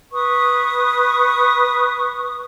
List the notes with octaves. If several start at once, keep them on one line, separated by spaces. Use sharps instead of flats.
B4 C#6 D#6